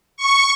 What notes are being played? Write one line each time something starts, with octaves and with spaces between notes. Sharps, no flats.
C#6